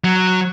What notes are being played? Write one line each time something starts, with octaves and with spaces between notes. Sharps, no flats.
F#3